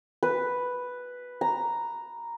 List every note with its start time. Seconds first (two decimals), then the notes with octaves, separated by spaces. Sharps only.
0.23 B4
1.41 A#5